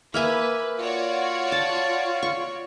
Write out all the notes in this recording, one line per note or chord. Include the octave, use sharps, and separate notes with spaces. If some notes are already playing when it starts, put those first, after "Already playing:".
A#3 B4 E5 G#5
F4 F#4 C#5 D5
A5
C#6